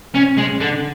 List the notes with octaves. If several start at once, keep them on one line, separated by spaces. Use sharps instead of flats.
C#4
G#3
D3